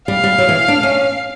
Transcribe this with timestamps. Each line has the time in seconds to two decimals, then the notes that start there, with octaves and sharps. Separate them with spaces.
0.08 G3 F5
0.24 G3
0.38 F#3
0.49 E3
0.68 D4
0.83 C#4